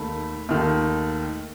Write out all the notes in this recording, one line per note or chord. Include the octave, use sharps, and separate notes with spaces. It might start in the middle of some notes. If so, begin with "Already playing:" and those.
Already playing: D#2 D#3 A3 B5
D#2 D#3 A3